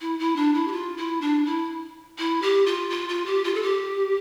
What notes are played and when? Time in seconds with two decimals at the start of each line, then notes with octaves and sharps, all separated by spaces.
0.01 E4
0.19 E4
0.36 D4
0.54 E4
0.67 G4
0.72 F4
0.97 E4
1.21 D4
1.45 E4
2.18 E4
2.42 G4
2.66 F4
2.90 F4
3.09 F4
3.26 G4
3.44 F4
3.54 A4
3.62 G4